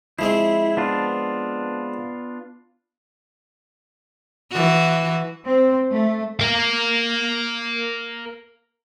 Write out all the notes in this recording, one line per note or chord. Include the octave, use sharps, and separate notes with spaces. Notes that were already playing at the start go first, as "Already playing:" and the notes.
F3 G#3 C4 E4
B3 D4 F4
E3 F#4
C4
A3
A#4 F5